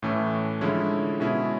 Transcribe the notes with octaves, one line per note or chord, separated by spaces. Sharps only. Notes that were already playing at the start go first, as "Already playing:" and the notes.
A2 E3 A3 C#4
D3 F3 G#3 C#4 E4
B2 G#3 C#4 E4 G#4